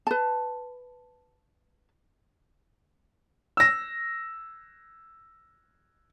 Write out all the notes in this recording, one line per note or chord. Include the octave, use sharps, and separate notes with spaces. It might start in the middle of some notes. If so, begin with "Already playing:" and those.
B4 A5
E6 A#6